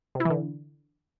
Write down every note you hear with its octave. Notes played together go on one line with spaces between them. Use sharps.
C3
E4
E3
D3